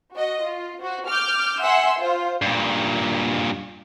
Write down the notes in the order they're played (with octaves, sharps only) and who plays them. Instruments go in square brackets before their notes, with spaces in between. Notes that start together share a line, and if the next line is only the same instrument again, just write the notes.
[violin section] F#4 D#5
F4
F#4 C5
D6 F6 G6
E5 F#5 G#5 C6 E6
F4 C5
[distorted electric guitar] G2 A#2